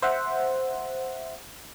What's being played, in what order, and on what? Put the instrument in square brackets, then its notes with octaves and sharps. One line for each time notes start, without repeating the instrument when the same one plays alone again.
[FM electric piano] C5 E5 F#5